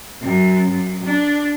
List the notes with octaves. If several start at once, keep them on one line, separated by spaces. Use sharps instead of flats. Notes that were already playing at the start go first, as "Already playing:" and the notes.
F#2
F#2
D4